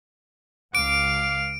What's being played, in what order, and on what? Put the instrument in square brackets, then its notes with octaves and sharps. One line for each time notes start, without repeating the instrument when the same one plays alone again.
[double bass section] C#2 [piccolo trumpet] F5 [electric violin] D6 [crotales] D7